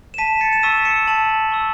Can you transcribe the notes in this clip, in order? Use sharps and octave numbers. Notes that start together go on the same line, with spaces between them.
E7
A5 B6 D#7
A6 C#7
E7
C#6 E6 B6 D#7
C#7 E7
A5 D#7 F#7
C#6 E6